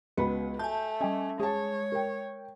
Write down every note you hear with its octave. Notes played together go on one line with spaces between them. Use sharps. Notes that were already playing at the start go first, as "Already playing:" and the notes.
C#2 B3 F#4 D#5 B5
A3 G#5 A5 G6
G3 C#4 D#5 G#5
G#3 G#4 C#5 A5
A#4 G5